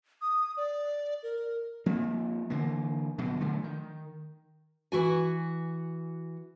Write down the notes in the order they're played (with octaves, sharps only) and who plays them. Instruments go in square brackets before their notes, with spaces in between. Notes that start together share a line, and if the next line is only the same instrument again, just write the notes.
[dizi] D#6
D5
A#4
[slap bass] F3 A#3 C4
D3 E3 A#3
D1 B2 F3 F#3
D3 F3 F#3 A3
D#3
[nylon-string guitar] E3 F#4 G#5